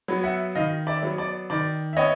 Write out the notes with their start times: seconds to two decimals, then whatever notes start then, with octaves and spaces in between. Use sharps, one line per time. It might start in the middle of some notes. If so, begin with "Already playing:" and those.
0.08 F#3 B3
0.23 E5 F#5
0.55 D#3 D#5 F5
0.87 D5 E5
1.03 F#3 B3
1.18 D5
1.50 D#3 D5
1.93 E5
1.97 B3 C#5 D#5